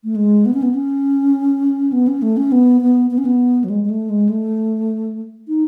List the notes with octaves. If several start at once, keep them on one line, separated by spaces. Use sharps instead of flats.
A3
G#3
B3
C#4
B3
C#4
B3
C#4
A3
C#4
B3
B3
B3
C#4
B3
F#3
G#3
G#3
A3
G#3
A3
D#4